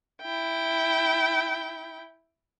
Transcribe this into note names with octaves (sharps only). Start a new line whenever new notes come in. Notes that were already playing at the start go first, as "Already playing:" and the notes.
E4 G5